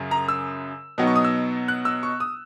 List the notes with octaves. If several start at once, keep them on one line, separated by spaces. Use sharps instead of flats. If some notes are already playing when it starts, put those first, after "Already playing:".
Already playing: F#2 C#3 F#3
A#5
E6
B2 F#3 B3 D#4
C#6
D#6
E6
F#6
E6
C#6
D#6